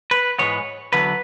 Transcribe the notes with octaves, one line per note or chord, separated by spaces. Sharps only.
B4
G#2 E3 G#3 B3 C#5
E2 D3 F#3 B3 B4